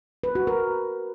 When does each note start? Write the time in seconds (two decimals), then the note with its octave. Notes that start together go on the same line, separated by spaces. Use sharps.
0.24 B4
0.35 F#4
0.47 A#4